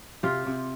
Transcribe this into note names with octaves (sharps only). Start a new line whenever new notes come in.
C3 F4 G4
C3